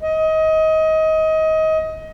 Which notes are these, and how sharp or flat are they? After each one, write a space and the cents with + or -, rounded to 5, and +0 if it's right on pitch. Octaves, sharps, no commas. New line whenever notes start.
D#5 +25